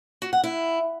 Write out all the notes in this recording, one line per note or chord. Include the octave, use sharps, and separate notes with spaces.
F#4
F#5
E4